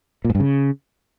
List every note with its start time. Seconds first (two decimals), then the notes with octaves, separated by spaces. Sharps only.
0.25 A#2
0.30 G#2
0.35 G2
0.40 C#3